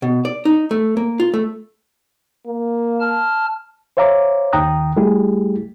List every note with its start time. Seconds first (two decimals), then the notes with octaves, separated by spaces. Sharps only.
0.02 B2
0.25 D5
0.45 D#4
0.71 A3
0.97 A#3
1.20 F4
1.34 A3
2.47 A#3
3.01 A5 F6
3.97 C5 C#5 E5 F5 A#5 D6
4.53 D#2 D#3 G5 A#5 D#6 F#6
4.96 G3 A3 E4 G4 G#4